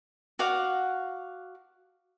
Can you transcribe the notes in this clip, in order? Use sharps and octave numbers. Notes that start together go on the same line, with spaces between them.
F#4 D5 F5 F#5